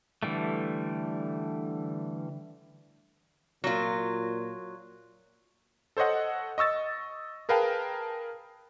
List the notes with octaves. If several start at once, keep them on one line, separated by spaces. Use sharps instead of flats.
D3 E3 G3 A3
A#2 F#3 F4
A4 C5 C#5 D#5 F#5
D#5 C#6 E6 A6
G#4 A#4 B4 F5 G5 A5